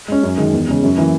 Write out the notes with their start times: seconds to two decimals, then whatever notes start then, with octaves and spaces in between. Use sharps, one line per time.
0.08 G#3 C#4
0.23 F#2
0.38 D#3 G#3
0.53 E2
0.68 C#3 G#3 C#4
0.83 F#2
0.98 E3 A#3